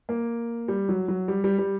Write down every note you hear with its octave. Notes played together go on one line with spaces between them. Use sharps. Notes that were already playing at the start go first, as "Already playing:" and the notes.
A#3
G3
F#3
F#3
G3
G3
G3